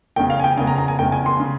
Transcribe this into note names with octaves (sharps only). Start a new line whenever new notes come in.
F1 E2 C#3 G5
F5
G#5
G5
F1 E2 C#3 G#5
A#5
A#5
G#5
F1 E2 C#3 G5
G#5
C6
C#3